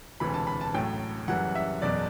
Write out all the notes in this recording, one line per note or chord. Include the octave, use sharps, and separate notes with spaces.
E1 D2 C3 E3 B5
A5
B5
A5
A1 A2 F#3 A3 G5
F#1 F#2 E3 G3 F#5
E5
F#1 E2 B2 F#3 D5